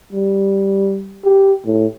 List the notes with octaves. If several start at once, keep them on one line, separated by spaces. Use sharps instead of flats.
G3
G4
A2